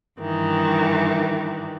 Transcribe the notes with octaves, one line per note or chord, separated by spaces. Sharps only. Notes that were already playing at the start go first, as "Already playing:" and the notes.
G2 D#3 E3